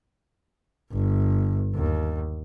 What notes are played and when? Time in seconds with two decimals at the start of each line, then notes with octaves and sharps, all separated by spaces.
0.92 G1
1.75 D#2